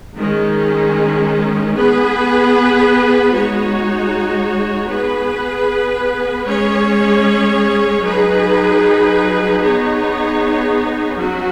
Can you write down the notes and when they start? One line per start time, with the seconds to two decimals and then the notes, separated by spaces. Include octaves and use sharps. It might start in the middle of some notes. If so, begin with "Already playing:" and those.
0.18 D#3 G#3 C#4
1.75 B3 G#4 B4
3.32 G#3 D#4 F#4 C#5
4.89 B3 G#4 B4
6.46 G#3 C#4 G#4 C#5
8.03 F#3 D#4 G#4 B4
9.60 B3 D#4 G#4 C#5
11.17 F#3 C#4 F#4